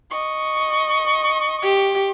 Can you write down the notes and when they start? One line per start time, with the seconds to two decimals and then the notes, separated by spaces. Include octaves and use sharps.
0.11 D#5 C#6
1.63 G4